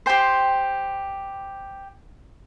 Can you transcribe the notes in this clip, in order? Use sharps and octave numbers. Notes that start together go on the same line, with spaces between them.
G4 C5 G5 C6